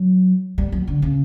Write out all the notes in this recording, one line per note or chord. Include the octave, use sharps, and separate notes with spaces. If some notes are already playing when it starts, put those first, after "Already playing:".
Already playing: F#3
G3
F#3
D3
C#3